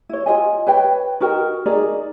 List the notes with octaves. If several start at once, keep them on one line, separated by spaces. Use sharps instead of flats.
E4 C#5
F4 G#4 D#5 G#5
B4 C#5 G5
D#4 F#4 A#4 G5
D#4 G#4 A#4 D5